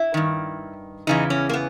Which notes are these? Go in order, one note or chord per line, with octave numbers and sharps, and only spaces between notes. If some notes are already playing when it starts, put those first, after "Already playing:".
Already playing: E4
G2 D#3
E2 C#3 E3 D#4
C#4
A#3
B3